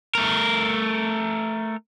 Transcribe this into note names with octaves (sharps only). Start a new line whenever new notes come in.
A3 A#4